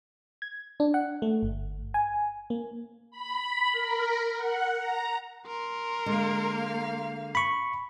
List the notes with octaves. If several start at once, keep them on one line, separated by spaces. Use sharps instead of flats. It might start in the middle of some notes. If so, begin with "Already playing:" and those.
G#6
D4
F#5
A3
G1
G#5
A#3
B5
A#4
F#5
A#5
A#4 C6
D3 G#3 A#3 F5
B5 C#6